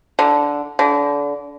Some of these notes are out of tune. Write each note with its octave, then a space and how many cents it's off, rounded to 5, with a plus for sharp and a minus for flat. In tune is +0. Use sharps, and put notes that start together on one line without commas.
D3 -10
D3 -30